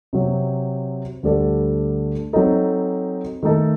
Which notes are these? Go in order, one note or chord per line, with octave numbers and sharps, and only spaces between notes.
C3 F#3 C4
D2 D3 G3 D4 A4
F#3 C4 D#4 A4
D#3 A3 D#4 A4